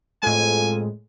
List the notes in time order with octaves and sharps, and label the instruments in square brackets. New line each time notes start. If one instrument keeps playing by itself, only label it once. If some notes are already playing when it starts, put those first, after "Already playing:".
[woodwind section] F2 [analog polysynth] A2 G#3 [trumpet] G#5